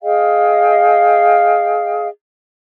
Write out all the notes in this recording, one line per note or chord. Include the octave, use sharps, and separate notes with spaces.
G#4 D#5 F5 G5